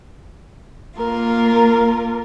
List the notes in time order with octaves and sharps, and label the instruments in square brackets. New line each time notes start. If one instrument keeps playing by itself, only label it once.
[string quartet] A#3 F4 [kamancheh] A#4